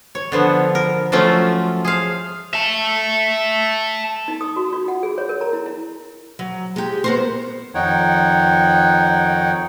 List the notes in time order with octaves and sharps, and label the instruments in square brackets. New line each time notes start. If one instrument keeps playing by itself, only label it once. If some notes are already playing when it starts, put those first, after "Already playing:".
[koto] C#5
D3 F3 B3
A#4
F3 F#3 A3 C#4 F4
G#4 C5 F5
[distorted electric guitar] E5 A5
[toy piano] D#4
D#6
F#4
F4
F#5
G#4
C#5
A#4
A#5
E4
E4
[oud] F#3
G#3 G4
B3 A#4 C5
[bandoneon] F2 D#3 D#4 C#5 F#5 G5